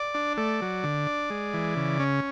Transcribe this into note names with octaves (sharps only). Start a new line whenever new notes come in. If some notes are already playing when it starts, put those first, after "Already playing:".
Already playing: D5
D4
A3 D5
F#3
D3
D4
G#3
E3
C#3
C#4